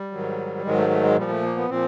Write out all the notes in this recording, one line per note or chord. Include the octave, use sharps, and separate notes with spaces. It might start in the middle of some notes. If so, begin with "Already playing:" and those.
Already playing: G3
G#2 D#3 F#3
G#2 D#3 F#3 G#3
A3
A3
G#3
A#2 F3 G3
A3
A#3
B3
A#2 F3 C4